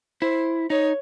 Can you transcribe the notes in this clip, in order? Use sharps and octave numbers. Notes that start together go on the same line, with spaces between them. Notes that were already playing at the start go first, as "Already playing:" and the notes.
E4 C5
D#4 C#5